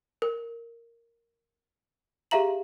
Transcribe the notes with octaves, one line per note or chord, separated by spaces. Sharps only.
A#4
G4 G#4 E5 F5 A#5 F#7